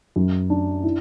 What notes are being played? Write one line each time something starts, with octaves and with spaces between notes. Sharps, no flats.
F#2
D4
E4